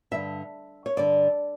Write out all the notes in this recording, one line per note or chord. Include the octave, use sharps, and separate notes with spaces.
G2 D3 E5
C#5
G2 D3 D5